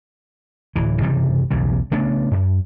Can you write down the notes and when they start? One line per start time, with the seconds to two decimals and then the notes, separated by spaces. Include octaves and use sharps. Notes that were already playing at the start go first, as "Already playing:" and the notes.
0.76 D1 E3
1.01 F#1 C3 E3 G3
1.51 B1 E2 C#3 G3
1.92 C#3 A3 B3 D4
2.31 F#2